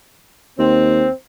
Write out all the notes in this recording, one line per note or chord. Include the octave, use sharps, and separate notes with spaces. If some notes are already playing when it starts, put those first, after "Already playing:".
D#2 C4